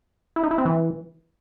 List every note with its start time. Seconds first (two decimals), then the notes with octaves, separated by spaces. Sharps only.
0.36 E4
0.44 D#4
0.51 E4
0.58 C4
0.65 E3